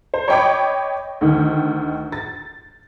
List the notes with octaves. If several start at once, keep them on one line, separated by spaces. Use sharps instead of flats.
C5
C#5 D#5 G5 B5 D6
D2 D#3
A6